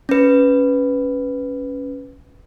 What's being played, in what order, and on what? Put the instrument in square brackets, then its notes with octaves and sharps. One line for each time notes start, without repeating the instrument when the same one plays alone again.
[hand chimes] C#4 B4